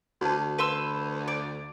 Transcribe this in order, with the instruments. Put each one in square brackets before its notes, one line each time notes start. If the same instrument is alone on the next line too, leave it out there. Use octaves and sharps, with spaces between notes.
[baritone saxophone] D2 [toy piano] F#4 A5
[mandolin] B4 C6 E6
D5